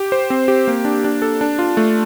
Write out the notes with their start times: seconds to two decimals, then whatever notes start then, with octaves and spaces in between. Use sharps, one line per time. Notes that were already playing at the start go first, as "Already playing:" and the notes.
Already playing: G4
0.12 C5
0.30 C4
0.48 G4
0.67 A#3
0.85 D4
1.04 D4
1.22 A4
1.41 D4
1.59 F4
1.77 A3